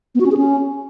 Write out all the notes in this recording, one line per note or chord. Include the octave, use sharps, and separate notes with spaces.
B3
F#4
C#4
G#4
C#4